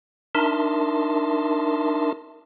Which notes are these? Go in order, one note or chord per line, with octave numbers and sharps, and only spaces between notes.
D4 D#4 A#4 E5 A5 C6